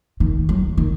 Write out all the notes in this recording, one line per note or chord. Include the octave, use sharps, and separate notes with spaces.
D#3
F#3
D#3